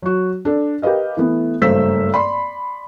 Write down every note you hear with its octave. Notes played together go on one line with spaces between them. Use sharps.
F#3 F#4
D4 A4 D5
G4 A#4 B4 D#5 F5
E3 A3 B3
F#1 G2 A3 C5 E6 B6
D5 B5 C6